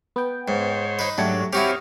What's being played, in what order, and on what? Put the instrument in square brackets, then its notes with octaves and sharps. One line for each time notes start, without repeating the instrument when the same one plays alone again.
[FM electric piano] B3 G5
[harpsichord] G#2 [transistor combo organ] C5 C#5
[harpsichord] D#4 B4
[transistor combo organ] G#2 D4 [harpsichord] F#3 [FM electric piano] G3 A3 C#5
[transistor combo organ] C4 C#5 [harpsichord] E4 F#4 G4 [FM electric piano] D#6 F6